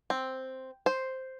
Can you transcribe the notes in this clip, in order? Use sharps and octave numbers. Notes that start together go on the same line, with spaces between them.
C4
C5